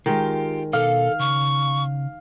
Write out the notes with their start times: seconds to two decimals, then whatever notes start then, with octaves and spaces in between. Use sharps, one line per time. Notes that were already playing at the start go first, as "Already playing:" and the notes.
0.06 D#3 G#3 F4 G4
0.73 B2 A4 F5
1.19 C#3 C#6